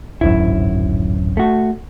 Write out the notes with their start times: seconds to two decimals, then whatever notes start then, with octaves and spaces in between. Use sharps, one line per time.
0.21 D1 G#1 F#2 E4
1.37 A3 F#4